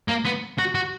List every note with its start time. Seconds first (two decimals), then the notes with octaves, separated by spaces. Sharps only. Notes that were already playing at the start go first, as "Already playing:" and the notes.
0.09 A#3
0.25 B3
0.58 F#4
0.75 F#4